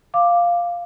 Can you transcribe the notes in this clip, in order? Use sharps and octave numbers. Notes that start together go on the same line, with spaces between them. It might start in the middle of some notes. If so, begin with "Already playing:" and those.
F5 D6